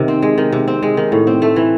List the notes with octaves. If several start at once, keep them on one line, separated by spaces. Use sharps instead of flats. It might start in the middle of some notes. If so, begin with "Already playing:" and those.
Already playing: C3 D#3
C4
G#3
D#3
C3
C4
G#3
D#3
A2
C4
A3
E3